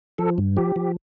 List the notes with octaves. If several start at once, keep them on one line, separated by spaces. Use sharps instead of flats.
F3 A4
G2
F3 G4
F3